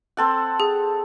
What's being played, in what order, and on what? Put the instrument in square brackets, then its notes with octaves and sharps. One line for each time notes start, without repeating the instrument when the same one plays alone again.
[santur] C4 A4 F#5
[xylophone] G#4